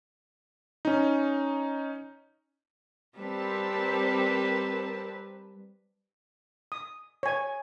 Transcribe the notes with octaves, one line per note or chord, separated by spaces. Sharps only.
C#4 D#4
G3 C4 A#4 B4 A5
D#6
C#5 G#5